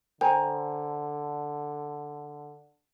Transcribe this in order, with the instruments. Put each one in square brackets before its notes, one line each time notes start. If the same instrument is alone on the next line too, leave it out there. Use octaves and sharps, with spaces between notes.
[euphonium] D3 [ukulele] C5 G#5 A#5 [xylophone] G5